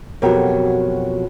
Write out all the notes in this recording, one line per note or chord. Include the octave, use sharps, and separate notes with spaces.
F2 B2 F#3 G4 A#4